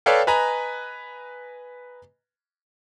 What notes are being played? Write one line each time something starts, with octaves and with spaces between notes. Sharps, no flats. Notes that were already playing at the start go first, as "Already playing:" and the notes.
A4 B4 C#5 D5 F5 G5
B4 D#5 G#5 A#5 B5 F#6